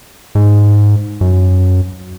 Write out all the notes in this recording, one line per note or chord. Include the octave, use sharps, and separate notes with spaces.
G#2
F#2